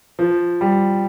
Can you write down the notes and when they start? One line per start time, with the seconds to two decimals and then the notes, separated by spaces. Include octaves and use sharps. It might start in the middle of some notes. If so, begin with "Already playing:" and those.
0.19 F3
0.61 G3